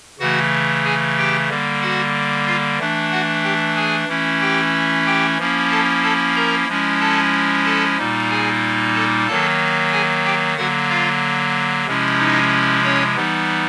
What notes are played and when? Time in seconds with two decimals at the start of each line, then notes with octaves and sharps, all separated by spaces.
0.19 C#3 E3 A3 F#4 F#5
0.84 G#4 G#5
1.17 G4 G5
1.49 D3 G3 A#3
1.82 F#4 F#5
2.47 F4 F5
2.79 E3 A3 D4
3.11 F#4 F#5
3.44 G4 G5
3.76 G#4 G#5
4.09 E3 A3 C#4 E4
4.41 G4 G5
5.06 G4 G5
5.38 F3 A#3 C#4 E4
5.71 A4 A5
6.03 A4 A5
6.36 A#4 A#5
6.68 F3 G#3 C#4 E4
7.00 A4 A5
7.65 A4 A5
7.98 A#2 G3 A#3 D#4
8.30 G#4 G#5
8.95 A4 A5
9.27 D#3 F#3 A#3 A4 A5
9.92 G#4 G#5
10.24 G4 G5
10.57 D3 F#3 A#3 F#4 F#5
10.89 F4 F5
11.87 C3 F3 G#3 C#4 E4
12.19 D#4 D#5
12.84 C#4 C#5
13.16 E3 G3 B3 D#4